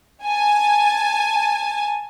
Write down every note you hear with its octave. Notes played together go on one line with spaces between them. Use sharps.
G#5 A5